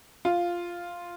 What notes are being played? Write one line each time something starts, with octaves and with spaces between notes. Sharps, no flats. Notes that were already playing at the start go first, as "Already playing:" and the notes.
F4